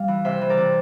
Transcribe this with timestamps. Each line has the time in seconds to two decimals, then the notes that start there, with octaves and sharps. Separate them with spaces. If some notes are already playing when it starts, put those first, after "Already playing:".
Already playing: G3 F5
0.08 E3
0.25 C3 C5 E5
0.41 E3
0.49 A#4 D5
0.57 C3